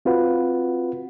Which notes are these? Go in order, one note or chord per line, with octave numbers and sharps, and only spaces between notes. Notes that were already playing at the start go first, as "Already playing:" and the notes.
C4 F4 F#4 B4 F#5